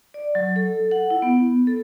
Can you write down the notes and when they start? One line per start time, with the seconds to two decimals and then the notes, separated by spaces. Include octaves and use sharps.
0.14 D5
0.35 F#3
0.56 A4
0.91 F#5
1.10 E4
1.22 B3
1.67 A4